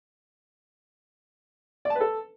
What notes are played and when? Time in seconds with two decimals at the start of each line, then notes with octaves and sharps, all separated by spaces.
1.85 D5
1.90 A5
1.95 B4
2.00 A4